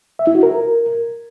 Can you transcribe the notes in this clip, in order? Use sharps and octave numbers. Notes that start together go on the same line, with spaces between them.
E5
E4
F#4
A#4